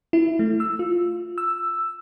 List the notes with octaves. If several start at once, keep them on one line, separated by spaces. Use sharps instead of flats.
E4
A3
E6
F4
E6